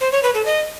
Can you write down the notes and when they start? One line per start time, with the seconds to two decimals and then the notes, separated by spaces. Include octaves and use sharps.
0.01 C5
0.12 C#5
0.23 B4
0.34 A4
0.45 D#5